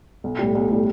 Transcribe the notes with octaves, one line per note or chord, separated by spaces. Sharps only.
B1
A2 G3
B1
A2 G3